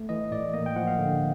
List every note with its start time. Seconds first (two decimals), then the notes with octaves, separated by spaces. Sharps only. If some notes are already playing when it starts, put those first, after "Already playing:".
Already playing: A3
0.09 E3 D#5
0.31 A2 D5
0.54 A#3 D#5
0.66 G5
0.76 F3 F#5
0.87 F5
0.98 D3